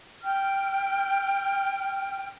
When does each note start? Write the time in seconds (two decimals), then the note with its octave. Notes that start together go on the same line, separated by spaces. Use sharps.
0.24 G5 F6